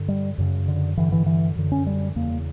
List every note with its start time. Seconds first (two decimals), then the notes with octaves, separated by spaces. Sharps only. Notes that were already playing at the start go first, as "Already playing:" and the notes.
Already playing: G2 D3
0.08 G3
0.38 F#2 C#3
0.68 D3
0.97 G2 D3 E3
1.12 E3
1.26 E3
1.56 F#2 D3
1.72 C#4
1.87 G3
2.16 E2 C#3 A#3